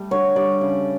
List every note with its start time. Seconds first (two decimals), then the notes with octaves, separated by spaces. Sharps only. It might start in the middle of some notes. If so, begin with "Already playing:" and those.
Already playing: G3 A3
0.11 D3 C#5
0.36 G3 D5
0.61 C#3